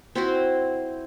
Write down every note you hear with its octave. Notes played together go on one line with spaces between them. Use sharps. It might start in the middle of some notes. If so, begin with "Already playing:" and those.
C4 E4 F#4 C5